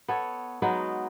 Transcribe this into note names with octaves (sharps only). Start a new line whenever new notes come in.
B3 A4 C#5
F#3 G#3 B3 D#4